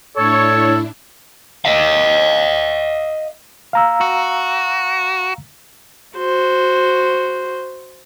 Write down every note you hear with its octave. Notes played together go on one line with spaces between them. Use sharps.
A2 D4 E4 A4 C#5
D#5 F5
F5 A#5 E6
F#4
F#4 C5